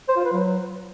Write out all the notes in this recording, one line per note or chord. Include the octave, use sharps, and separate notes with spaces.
C5
F4
B4
F#3